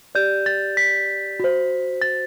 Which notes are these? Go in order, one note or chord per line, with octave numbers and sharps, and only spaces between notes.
G4 D5 G6
A6
B6
F#4 C5
A6